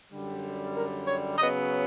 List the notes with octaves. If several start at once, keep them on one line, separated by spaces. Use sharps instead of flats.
F#2 D3 G3
A#4
C#5
C#3 F#3 B3 D#5